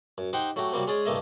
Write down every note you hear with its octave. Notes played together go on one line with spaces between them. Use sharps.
F#2
D#4 G4 C5 F#5 G5
F#3 A3 F#4 G4
C3 F#3 G3 A#3 C4
G#3 C#4 G#4 D5
C2 G2 A3 A#3 D#5 E5